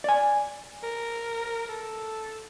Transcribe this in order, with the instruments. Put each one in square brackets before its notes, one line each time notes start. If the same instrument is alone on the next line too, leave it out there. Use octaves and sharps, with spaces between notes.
[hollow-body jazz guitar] D5 G#5
[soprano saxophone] A#4
A4